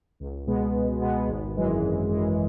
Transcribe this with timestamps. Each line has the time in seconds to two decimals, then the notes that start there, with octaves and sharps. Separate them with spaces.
0.20 C#2
0.47 B2 G#3 B3
0.75 C#2
1.02 B2 G#3 B3
1.29 G#1
1.57 F#2 E3 G#3
1.84 G#1
2.11 F#2 E3 G#3